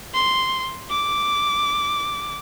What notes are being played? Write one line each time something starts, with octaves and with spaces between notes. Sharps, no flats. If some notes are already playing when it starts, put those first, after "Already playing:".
C6
D6